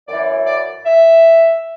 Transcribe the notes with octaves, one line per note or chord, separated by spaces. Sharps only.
F#2 E3 D5
D5
E5